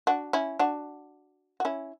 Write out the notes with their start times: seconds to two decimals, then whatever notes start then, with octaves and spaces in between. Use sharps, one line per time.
0.07 D4 F#4
0.33 C#4 E4
0.59 D4 F#4
1.60 F#4
1.65 C#4 E4